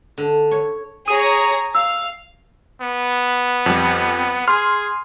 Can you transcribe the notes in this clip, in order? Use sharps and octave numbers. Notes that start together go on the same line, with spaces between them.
D3
C#5
G#4 C#5 A#5 D#6 D#7
F5 E6
B3
F2 G3
G#4 C6 F6